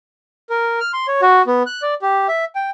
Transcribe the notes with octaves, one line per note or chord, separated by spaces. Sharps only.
A#4
F6
C6
C#5
F#4
B3
F#6
D5
G4
E5
G5